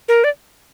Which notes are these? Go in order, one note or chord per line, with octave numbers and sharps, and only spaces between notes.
A#4
D5